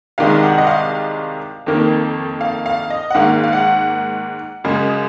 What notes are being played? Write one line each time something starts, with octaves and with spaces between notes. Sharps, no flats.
C2 C3 D#3 G#3 F5
F#5
D#5
F5
F2 D#3 A#3
F5
F5
D#5
F#5
G#2 D#3 A#3 F5
F5
F#5
F#2 C#3 G#3